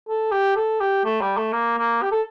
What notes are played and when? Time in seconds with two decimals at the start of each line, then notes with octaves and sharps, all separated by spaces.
0.09 A4
0.32 G4
0.56 A4
0.81 G4
1.05 A3
1.21 G3
1.37 A3
1.53 A#3
1.78 A#3
2.02 G4
2.12 A4